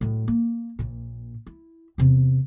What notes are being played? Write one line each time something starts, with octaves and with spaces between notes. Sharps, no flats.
A2 F#3
A#3
A#1 A#2
E4
E2 C3